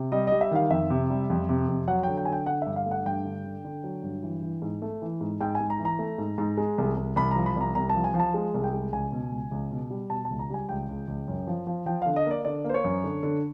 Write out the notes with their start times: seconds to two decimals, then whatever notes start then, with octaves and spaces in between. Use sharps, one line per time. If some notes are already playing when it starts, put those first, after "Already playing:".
Already playing: C3
0.12 G3 D#5
0.27 G3 D#5
0.41 E5
0.51 D#3 F5
0.70 F2 E5
0.90 C3
1.10 G3
1.30 F2
1.49 C3
1.68 F2
1.88 F#3 F#5
2.03 D3 G5
2.17 G5
2.25 D3 G#5
2.32 G5
2.46 D3 F#5
2.62 G2 E5
2.76 F5
2.86 A3
2.91 F#5
3.05 G2 G5
3.25 D3
3.44 D3
3.65 D3
3.84 F#3
4.03 G2
4.23 E3
4.42 E3
4.62 G#2
4.82 A3
5.02 E3
5.21 G#2
5.41 G#2 G5
5.55 G#5
5.60 G#2
5.70 A#5
5.79 E3
5.85 A#5
5.99 A3
6.18 G#2
6.38 G#2
6.57 G#3
6.78 C2
6.96 C2
7.16 C2 B5
7.31 F3 A#5
7.46 B5
7.56 C2 A#5
7.75 C2 A#5
7.89 A5
7.95 F3
8.04 G#5
8.14 F3
8.20 A5
8.34 G#3
8.54 C2
8.64 G5
8.73 G#3
8.93 C#2 G#5
9.12 B2
9.32 C#2
9.51 C#2
9.71 B2
9.90 G3
10.10 B2 A5
10.25 A5
10.30 C#2
10.39 A#5
10.50 G3 G#5
10.69 C#2 G5
10.89 C#2
11.08 C#2
11.28 F#2
11.47 F3
11.67 F3
11.86 F3 G5
12.02 D3 F5
12.16 D#5
12.26 A#3 D5
12.45 D3 D5
12.64 A#3
12.69 C5
12.74 C#5
12.84 F#2
13.04 D3
13.23 D3